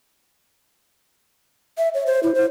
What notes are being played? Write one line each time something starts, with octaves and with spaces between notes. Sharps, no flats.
E5
C#5
C5
E4
C5